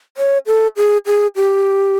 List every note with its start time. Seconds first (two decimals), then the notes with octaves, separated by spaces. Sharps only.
0.17 C#5
0.47 A4
0.77 G#4
1.06 G#4
1.36 G4